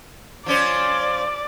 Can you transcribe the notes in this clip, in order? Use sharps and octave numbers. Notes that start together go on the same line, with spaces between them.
F3 C#4 C5 D5